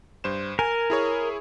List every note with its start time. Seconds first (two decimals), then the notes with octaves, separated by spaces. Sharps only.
0.24 G2 C5 E7
0.59 A#4 G#5
0.90 E4 G#4 C#5